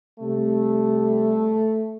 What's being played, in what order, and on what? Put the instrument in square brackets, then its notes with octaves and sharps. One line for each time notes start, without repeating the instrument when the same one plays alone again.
[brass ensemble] C3 G3 A3